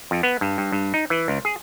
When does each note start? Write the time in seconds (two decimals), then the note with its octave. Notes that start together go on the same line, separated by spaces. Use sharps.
0.11 F2
0.23 B3
0.41 G2
0.58 G2
0.72 G2
0.94 D#4
1.10 E3
1.28 C#2
1.45 G#4